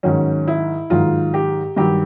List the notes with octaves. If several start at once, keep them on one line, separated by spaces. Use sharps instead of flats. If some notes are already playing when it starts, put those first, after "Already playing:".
G#2 D#3 F#3 C#4
E4
G#2 D#3 F#3 F4
G4
G2 D#3 F#3 G4